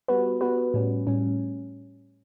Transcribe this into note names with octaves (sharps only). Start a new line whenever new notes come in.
G3 B3 F#4 B4
G3 B3 F#4 B4
A2 G3 C#4
A2 G3 C#4